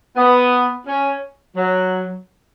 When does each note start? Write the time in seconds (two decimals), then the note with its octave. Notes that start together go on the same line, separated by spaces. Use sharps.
0.17 B3
0.86 C#4
1.56 F#3